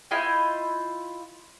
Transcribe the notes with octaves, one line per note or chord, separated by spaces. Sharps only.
E4 F4 D#5 G5